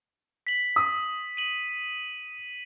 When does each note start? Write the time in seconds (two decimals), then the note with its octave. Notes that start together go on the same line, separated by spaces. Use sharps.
0.47 B6 F#7
0.76 D#6
1.37 D#7 F#7